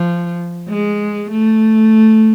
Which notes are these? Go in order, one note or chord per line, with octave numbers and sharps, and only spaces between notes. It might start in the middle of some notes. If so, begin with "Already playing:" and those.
Already playing: F3
G#3
A3